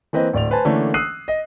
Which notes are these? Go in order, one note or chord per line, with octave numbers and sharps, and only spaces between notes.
E3 A#3 C4 B4 D#5
D1 D5 F7
B4 C5 G#5 A5
D3 E3 A3 A#3 C#4 D4
D#6 E6 F#6 C7 D#7
D#5